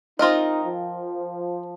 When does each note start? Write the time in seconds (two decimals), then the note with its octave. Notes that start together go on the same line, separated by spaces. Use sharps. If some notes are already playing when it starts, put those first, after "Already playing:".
0.19 C4 D#4 F4 A#4 D#5
0.64 F3